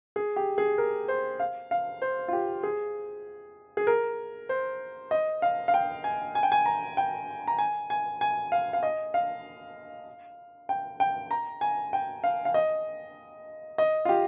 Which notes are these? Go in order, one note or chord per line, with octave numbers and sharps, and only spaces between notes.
G#4
G4
G#4
A#4
C5
F5
F5
C5
F4
G4
G#4
G#4
A#4
C5
D#5
F5
F5
G5
G#5
G#5
G5
G#5
A#5
G5
A#5
G#5
G#5
G#5
F5
F5
D#5
F5
G5
G5
A#5
G#5
G5
F5
F5
D#5
D#5
F4
G4